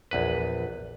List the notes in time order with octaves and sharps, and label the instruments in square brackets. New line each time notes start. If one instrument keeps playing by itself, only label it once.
[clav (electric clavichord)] A#1 E2 B4